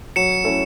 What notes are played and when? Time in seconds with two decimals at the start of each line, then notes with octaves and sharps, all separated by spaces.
0.16 F#3 C#7 E7
0.44 A3 C#4 E4 A4